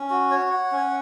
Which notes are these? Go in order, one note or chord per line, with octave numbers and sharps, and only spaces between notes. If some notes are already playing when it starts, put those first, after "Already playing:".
Already playing: C#4
F#4
C#5
F#5
C#4